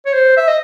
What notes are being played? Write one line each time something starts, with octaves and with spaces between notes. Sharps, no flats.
C#5
C5
E5
D#5